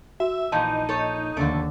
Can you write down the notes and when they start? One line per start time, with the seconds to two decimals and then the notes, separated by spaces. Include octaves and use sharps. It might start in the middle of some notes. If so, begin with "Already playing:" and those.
0.20 F#4 E5
0.52 A#1 A#2 E3 D#4 A5
0.89 A4 C#5
1.37 D#2 D3 F3 A3